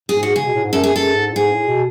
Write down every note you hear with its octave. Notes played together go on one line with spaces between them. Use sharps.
G#2 G#4
F#4
C#3 G#4
B2
A2
G#2
F#2 A4
G#4
F#2 A4
G#2
A2
G#2 G#4
A2
B2